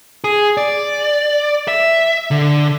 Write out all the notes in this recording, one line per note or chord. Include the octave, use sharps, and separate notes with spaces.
G#4
D5
E5
D3